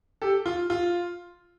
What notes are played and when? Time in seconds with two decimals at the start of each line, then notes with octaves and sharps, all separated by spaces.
0.22 G4 A4
0.46 F4
0.70 F4